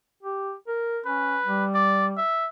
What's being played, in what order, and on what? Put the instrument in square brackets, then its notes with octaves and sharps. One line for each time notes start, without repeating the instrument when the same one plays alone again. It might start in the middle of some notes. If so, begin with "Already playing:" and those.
[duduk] G4
A#4
[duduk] C#4 [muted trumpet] B4
[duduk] G3
[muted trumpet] D5
E5